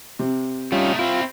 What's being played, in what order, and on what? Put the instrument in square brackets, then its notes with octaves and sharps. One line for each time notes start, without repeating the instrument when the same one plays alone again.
[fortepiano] C3
[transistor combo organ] G3 C#4 F4 [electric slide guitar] A3 D#4
[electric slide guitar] C4 E4 [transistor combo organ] F4